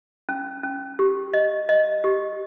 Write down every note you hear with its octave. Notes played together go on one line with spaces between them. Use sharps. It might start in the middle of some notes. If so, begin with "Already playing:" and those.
C#4
C#4
G4
D#5
D#5
G4